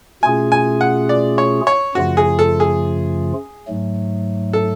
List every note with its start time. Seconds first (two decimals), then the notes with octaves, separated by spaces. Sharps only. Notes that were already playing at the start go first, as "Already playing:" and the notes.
0.23 B2 A3 C#4 F4 G#4 G#5
0.52 G#5
0.81 F#5
1.09 D5
1.38 C#5
1.67 C#5
1.95 F#2 C#3 F3 A3 F4 F#4
2.17 G#4
2.39 A4
2.60 G#4
3.67 G#2 F#3 A3
4.53 A4